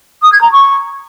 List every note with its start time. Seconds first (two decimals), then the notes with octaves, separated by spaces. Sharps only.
0.22 D#6
0.32 G#6
0.42 A#5
0.52 C#6